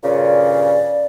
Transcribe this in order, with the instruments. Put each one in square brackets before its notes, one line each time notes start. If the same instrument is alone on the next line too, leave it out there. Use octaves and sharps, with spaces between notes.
[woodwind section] G2 A#2 C#3 [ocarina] D5